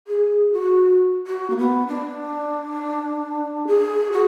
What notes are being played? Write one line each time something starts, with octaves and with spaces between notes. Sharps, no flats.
G#4
F#4
F#4
A#3
B3
D4
G#4
F#4